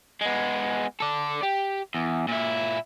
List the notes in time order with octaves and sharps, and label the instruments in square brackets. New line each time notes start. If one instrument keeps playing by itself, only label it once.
[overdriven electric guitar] G#3 B3
A4 D5
G4
E2
A#2 E4